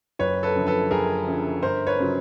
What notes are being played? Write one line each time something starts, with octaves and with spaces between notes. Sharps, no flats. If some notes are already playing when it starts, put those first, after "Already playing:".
F#1 B4 C#5
A4 B4
F#2 D3 F3
A4 B4
F#1 G#4 A#4
F#2 D3 F3
G1 A#4 C5
B4 C#5
C#3 F#3